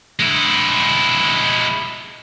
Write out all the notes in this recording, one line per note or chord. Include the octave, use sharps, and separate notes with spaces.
G#3 E4